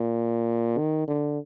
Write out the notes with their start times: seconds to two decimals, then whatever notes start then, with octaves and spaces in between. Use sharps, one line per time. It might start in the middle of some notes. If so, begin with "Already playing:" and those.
Already playing: A#2
0.78 D#3
1.08 D3